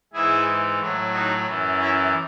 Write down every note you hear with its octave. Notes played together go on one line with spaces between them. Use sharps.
G#2 E3 E4 G#4
A2 F#3
D#4 F#4
F#2 E3
C#4 E4